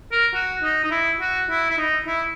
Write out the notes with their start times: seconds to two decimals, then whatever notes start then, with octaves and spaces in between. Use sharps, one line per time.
0.12 A#4
0.34 F#4
0.62 D#4
0.84 D#4
0.91 E4
1.21 F#4
1.49 E4
1.70 E4
1.78 D#4
2.07 E4